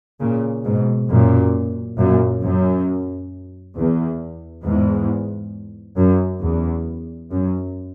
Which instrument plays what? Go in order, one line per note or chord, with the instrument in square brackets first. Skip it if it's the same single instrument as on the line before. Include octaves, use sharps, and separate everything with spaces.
[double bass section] A#2 C#3
G#2 B2
F#2 A#2
F#2 A#2
F#2
E2
E2 G#2
F#2
E2
F#2